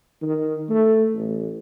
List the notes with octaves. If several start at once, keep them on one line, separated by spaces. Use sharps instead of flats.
D#3
A3
A1